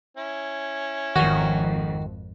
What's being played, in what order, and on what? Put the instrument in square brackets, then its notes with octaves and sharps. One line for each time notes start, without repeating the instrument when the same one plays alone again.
[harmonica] C#4 E4
[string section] G#1 F2 [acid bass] D#3 [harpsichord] F#4